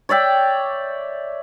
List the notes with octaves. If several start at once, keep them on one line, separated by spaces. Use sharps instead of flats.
C#5 D5 E5 G5